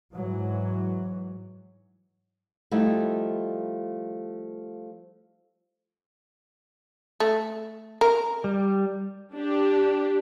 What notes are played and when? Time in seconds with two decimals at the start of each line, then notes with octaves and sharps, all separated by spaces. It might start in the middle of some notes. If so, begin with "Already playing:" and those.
0.14 G#2 E3 F#3
2.71 F3 G3 A3 D#4 E4
7.20 A3
8.01 A#4
8.44 G3
9.35 D4 G4